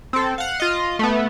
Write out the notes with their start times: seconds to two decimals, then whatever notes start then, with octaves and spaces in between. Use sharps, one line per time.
0.13 C4 A4
0.38 F5 F#5
0.60 F4 D#5
0.99 A3 B3